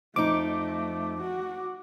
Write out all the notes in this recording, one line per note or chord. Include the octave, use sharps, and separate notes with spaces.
F2 A3 D#4 D6
F#4